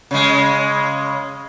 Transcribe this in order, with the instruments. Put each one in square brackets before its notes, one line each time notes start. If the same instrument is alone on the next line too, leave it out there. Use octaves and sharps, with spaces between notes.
[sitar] C#3 G#3